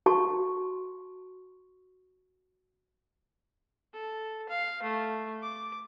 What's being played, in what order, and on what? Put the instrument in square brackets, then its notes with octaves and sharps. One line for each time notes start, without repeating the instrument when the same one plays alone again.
[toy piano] F#4 A5 C#6
[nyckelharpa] A4
F5
A3
D6